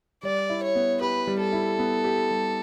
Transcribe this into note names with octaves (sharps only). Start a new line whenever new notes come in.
G3 D5
E4
C#5
B3
G4 B4
G3
A4
E4
B3
G4
G3